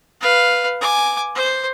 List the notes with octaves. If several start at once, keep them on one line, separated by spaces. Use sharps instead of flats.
B4 F5
G#5 D6
C5